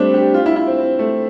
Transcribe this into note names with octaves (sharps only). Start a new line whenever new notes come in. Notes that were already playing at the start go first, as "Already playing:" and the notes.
Already playing: G3 A3 C4 D4
G4
F4
E4
E4
C4
C4
A3